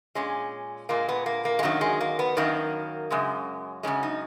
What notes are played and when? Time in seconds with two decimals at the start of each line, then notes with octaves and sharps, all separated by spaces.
0.15 A#2 G#3 C#4
0.89 A#2 G#3 A#3
1.09 B3
1.26 A#3
1.45 A#3
1.59 G#3
1.63 F#2 D#3 F#3 A#3
1.81 G#3
2.01 A#3
2.19 B3
2.37 F#2 D#3 F#3 A#3
3.11 F#2 C#3 G#3
3.83 F#2 C#3 E3 G#3 C#4
4.03 D#4